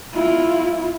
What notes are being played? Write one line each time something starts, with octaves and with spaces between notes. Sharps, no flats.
E4 F4